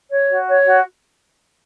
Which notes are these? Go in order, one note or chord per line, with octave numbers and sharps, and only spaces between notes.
C#5
F#4
C#5
F#4